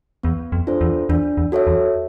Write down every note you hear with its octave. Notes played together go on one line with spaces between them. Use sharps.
E2 B3
F2
D4 F4 A4 C5
E2
E2 D4
E2
F#4 A4 C#5 E5
E2